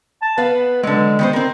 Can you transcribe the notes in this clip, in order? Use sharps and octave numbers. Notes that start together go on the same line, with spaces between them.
A5
B3 B4 F5
D3 F#3 G#3
D#3 B3 C5
C4 A#4